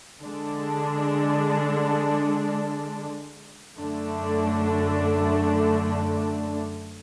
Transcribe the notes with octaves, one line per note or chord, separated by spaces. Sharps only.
D3 G#3 D4
F#2 D3 A3 D4